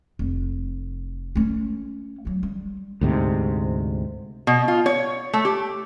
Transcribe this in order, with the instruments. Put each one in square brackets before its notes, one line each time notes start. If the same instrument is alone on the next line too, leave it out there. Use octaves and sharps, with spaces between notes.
[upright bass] F1
A3 C#4
F3 F#3
G3
[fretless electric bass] D2 G#2 C3
[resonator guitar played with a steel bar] B2
F4
C#5
A3
G4